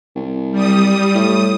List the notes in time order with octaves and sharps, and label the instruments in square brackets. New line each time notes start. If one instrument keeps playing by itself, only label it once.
[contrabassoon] C2
[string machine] G3 D#6
[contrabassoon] A2 [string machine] D#6